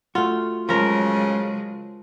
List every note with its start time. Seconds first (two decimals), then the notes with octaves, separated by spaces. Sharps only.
0.15 A3 F4 F#4
0.69 C#3 F3 F#3 G#3 A#4